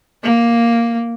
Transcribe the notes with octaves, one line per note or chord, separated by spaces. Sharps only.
A#3